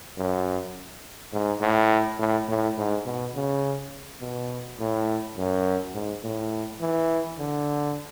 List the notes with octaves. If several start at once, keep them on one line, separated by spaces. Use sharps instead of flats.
F#2
G#2
A2
A2
A2
G#2
B2
C#3
B2
A2
F#2
G#2
A2
E3
D3